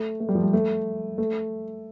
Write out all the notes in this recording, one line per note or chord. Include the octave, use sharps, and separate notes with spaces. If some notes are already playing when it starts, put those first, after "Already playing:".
Already playing: A3
A3
G3
F3
G3
A3
A3